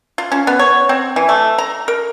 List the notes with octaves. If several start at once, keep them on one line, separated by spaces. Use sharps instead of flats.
F4
C#4
B3
C#5
C4
E3
A3
A#5
A#4